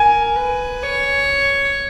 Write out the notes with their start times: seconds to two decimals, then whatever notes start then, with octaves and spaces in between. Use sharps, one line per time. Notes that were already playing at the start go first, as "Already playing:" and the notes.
Already playing: A#4 G#5
0.36 B4
0.83 C#5